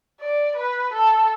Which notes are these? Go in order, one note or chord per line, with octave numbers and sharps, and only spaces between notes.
D5
B4
A4